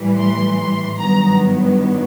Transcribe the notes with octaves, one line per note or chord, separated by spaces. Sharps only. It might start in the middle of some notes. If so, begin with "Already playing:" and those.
Already playing: A2 E3 G3
C6
G2 D#3 F#3 B3 A#5